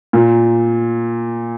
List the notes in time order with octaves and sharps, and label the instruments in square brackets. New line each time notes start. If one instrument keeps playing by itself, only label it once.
[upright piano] A#2